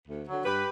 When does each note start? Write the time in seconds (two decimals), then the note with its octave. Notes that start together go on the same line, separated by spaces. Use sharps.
0.08 D2
0.27 D3 F#3
0.45 G2 G4 B4